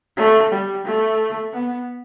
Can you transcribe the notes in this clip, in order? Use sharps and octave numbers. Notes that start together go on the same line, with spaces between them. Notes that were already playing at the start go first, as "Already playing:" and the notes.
A3
G3
A3
B3